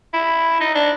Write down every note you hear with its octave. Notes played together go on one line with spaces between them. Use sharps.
E4
D#4
D4